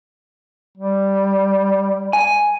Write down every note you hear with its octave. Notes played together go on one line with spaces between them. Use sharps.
G3
G#5